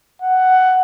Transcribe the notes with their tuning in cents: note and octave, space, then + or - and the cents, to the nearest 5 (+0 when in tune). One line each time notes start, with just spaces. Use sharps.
F#5 +10